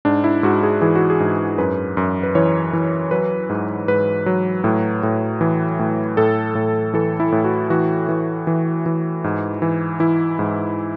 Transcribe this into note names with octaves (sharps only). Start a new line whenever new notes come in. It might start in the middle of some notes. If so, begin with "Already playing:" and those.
G#2 D4
E4
G#2 F#4
G#4
E3 G#4
F#4
G#4
G#2
F#2 B4
F#2
B4
E3 C#5
E3
F#3 B4
G#2
G#2 B4
F#3
A2
A2
E3
A2
A2 A4
A2
E3 A4
E4
A2
F#4
E3 F#4
E3
E3
E3
G#2
E3
E3 E4
G#2